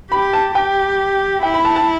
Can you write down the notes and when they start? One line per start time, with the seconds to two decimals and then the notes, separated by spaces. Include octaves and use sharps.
0.11 G4 B5
0.33 A5
0.55 G4 G5
1.43 E4 G5
1.54 B5
1.65 A5
1.76 A5